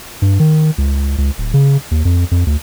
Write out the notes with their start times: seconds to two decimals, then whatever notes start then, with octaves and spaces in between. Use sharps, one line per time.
0.22 G2
0.40 D#3
0.78 C#2
1.18 C#2
1.38 D1
1.54 C#3
1.91 D#2
2.05 F2
2.31 F2
2.46 D2